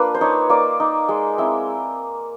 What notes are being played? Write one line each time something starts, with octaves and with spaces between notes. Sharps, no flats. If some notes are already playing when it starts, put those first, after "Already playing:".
Already playing: A#3 D4 F4 B4
C5
D#4 C#5
A#3 D5
D#4
G#3
C4 E4